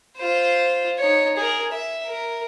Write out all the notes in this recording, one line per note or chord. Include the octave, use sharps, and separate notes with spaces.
F4 C5
D#4 C#5
G#4 A#4
E5
A#4